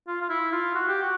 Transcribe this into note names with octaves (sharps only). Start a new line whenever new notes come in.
F4
F4
E4
F4
F#4
G4
F#4